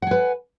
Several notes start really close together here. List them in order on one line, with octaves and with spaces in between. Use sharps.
F#5 G#5 B4